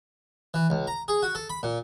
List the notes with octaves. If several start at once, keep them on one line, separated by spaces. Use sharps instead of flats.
E3
C#2
A#5
G#4
F#4
A4
B5
A#2